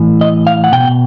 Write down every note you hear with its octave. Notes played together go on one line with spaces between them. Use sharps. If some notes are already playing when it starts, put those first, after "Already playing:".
Already playing: A2 E3
D#5
F5
F#5
B2 G5